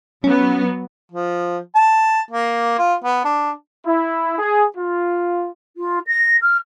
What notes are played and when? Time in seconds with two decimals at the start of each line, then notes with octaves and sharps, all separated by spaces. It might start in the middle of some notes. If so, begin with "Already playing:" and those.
0.24 F#3 B3 C#4
1.12 F3
1.75 A5
2.31 A#3
2.78 F4
3.04 B3
3.24 D4
3.85 E4
4.38 G#4
4.77 F4
5.77 F4
6.06 A#6
6.42 F6